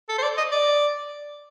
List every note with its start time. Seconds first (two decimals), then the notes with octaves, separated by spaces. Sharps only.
0.09 A4
0.18 C5
0.23 D5
0.38 D#5
0.52 D5